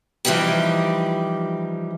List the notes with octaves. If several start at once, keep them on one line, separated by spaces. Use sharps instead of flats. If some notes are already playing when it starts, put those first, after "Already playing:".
E3 F3 G3 D#4 G4